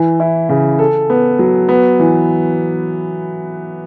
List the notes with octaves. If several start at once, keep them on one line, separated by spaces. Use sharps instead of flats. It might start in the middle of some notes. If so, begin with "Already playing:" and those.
Already playing: E3
E4
C#3
A4
B3
F#3
B3
E3